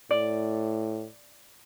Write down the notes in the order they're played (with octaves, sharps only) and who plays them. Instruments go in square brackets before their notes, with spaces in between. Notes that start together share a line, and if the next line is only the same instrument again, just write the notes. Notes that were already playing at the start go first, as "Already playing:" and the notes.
[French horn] A2 [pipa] D5